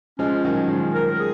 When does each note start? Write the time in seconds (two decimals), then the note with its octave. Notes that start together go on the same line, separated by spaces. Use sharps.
0.19 F3 G#3 C#4
0.45 D#3 F#3
0.68 F3 G#3
0.94 A#4
1.19 G#4